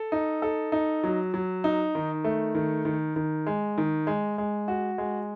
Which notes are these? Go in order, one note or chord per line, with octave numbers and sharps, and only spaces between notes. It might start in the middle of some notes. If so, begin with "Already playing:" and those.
Already playing: A4
D#4
A4
D#4
F#3
F#3
D#4
D#3
A3
D#3
D#3
D#3
G#3
D#3
G#3
G#3
F#4
G#3